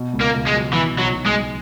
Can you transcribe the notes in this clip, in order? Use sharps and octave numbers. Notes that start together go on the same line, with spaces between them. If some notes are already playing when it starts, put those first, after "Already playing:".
Already playing: B2
C#2
A#3
C#2
G#3
F#3
B2 E3
B1
F#3
B1
G#3
F#3